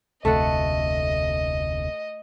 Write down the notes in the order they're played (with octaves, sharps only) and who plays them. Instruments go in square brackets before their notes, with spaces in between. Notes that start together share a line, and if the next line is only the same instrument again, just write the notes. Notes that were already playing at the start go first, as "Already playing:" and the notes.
[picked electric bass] F1 D2 C3 [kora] A3 A4 F#5 [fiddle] D#5